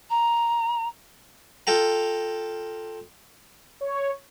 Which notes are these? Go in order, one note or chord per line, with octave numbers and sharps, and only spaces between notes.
A#5
F4 A4 G5 A#5
C#5